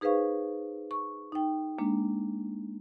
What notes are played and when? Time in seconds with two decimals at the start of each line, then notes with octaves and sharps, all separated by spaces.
0.01 D#4 G#4 B4 C5 F5 C#6
0.91 C#6
1.32 D#4 G5
1.79 G#3 A#3 D4